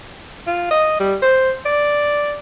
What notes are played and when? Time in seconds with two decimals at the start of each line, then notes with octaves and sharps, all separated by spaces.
0.46 F4
0.71 D#5
1.00 G3
1.22 C5
1.66 D5